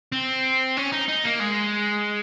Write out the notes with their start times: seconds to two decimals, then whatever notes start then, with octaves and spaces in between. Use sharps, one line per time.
0.12 C4
0.77 C#4
0.92 D#4
1.08 D#4
1.25 A#3
1.40 G#3